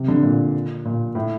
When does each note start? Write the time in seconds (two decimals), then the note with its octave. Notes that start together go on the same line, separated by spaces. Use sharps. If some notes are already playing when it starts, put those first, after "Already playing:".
Already playing: C3
0.08 D3
0.23 A#2
0.85 A#2
1.15 A2